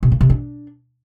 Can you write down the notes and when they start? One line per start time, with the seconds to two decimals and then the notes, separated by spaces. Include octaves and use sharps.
0.03 C3
0.12 C#3
0.21 C3
0.30 D4